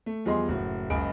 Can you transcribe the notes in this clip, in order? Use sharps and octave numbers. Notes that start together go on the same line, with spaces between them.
A3
E2 F3 G3 G#4 D#5 C6
F#1 A2 F#4
F#1 C#2 D#5 G#5 B5 D7